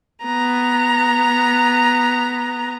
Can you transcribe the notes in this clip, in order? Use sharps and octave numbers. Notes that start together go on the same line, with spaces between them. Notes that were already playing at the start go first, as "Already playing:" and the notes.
B3 A#5